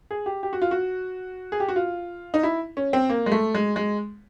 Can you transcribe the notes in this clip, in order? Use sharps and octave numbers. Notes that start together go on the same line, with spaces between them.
G#4
G4
G4
F#4
F4
F#4
G#4
G4
F#4
F4
D#4
E4
C#4
C4
A#3
G#3
A3
G#3
G#3